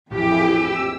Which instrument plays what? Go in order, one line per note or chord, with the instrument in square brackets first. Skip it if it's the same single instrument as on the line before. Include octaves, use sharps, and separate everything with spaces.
[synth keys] A#1 A2 E3 [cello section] F2 G4 [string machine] E4 G#4
[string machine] E6